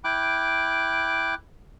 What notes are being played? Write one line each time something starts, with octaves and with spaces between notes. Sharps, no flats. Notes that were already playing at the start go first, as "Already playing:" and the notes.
E4 G5 D6 F#6